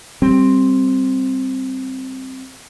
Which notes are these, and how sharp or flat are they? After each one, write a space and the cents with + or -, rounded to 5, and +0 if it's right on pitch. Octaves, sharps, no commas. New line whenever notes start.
G3 +0 C4 +0